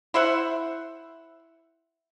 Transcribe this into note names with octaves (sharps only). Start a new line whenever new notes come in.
E4 C5 E5 F#5